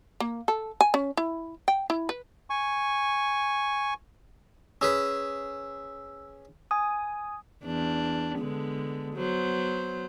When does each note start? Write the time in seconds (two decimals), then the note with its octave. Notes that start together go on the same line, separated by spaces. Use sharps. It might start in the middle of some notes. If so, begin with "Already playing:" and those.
0.20 A#3
0.48 A4
0.81 G#5
0.94 C#4
1.17 E4
1.68 G5
1.90 E4
2.09 B4
2.50 G#5 C#6
4.81 C#4 G#4 B4 E6
6.71 G#5 D#6
7.64 E2 D4
8.39 D3 G#3 B3
9.14 F#3 B3 C5